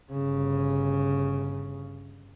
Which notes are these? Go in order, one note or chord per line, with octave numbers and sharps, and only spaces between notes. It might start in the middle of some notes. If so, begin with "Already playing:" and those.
G1 C#3